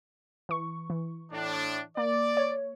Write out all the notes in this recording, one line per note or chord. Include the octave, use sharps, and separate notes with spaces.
E3 C#6
E3
A2 D4
A#3 D5
C#5